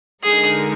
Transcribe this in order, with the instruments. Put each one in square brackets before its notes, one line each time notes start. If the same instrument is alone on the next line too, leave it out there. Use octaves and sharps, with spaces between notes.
[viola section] D3 G#3 D#4 A#4 [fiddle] G#4